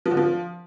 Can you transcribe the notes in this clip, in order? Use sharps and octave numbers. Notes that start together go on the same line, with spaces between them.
F3
D3
F3